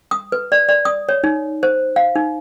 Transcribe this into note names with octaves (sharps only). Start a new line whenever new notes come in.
D#6
B4
D5
D5
D#6
C#5
D#4
C5
F5
D#4